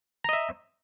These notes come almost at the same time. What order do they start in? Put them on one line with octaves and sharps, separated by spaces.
A#5 D#5 E5